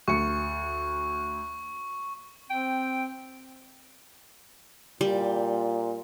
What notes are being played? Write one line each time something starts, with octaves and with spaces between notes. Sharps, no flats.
D2 C#6 C#7
C4 G5
A#2 G3